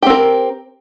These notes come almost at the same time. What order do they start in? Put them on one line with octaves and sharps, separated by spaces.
G4 C4 A#4